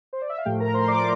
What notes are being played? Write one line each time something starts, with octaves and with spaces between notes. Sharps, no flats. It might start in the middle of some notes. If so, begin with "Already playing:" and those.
C5
D5
E5
F5
A2 F3 A3 G4 G5
A#4 A#5
C5 C6
D5 D6